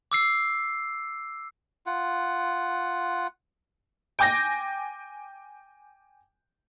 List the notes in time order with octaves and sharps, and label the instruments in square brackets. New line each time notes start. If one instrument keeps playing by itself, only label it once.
[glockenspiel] D6 E6 C7
[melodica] F4 F#5
[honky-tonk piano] G5 G#5 D6 G6 A#6